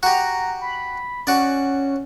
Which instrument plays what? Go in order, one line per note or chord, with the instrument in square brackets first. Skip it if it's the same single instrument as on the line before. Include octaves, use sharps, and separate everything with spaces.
[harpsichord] F#4 G4 [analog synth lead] A#5
[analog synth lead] B5
[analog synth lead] C#4 [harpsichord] F#4 D5